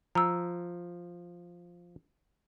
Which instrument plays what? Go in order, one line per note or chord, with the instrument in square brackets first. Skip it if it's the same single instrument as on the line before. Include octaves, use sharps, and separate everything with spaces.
[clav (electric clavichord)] F3 [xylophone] A#5 E6